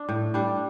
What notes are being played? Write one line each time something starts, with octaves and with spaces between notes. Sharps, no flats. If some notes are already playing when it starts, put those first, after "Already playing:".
Already playing: D4
A2
G3 D4